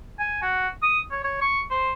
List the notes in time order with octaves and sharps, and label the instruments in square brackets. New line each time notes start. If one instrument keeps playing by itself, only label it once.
[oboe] G#5
F#4
D#6
C#5
C#5
C#6
C5